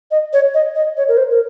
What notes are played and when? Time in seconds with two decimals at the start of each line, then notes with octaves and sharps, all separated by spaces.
0.11 D#5
0.33 C#5
0.54 D#5
0.75 D#5
0.97 C#5
1.08 A#4
1.17 C5
1.31 A#4